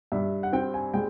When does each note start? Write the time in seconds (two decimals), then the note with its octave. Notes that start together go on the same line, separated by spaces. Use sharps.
0.12 G2 E5
0.43 F#5
0.53 C4 G5
0.74 G#5
0.94 G#3 G5